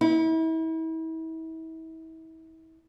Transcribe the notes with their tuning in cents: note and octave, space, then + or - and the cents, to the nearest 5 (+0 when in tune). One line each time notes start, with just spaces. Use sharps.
E4 -35